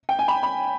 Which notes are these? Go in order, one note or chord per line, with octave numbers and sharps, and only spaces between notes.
G5
G#5
B5
B5